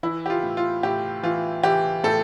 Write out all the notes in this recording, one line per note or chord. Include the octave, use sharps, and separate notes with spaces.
E3 E4
G4
F4
A2
F4
A2 G4
E3 F4
E3 G4
A2 A4